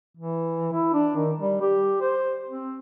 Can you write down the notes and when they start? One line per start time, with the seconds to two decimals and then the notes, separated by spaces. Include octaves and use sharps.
0.17 E3
0.73 E4
0.93 D4
1.16 D#3
1.39 G3
1.61 G4
2.01 C5
2.48 C4